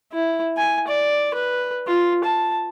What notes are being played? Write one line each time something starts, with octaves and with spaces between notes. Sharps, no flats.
E4
G#5
D5
B4
F4
A5